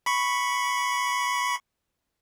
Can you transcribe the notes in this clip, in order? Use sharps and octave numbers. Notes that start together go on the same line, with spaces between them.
B5 C#6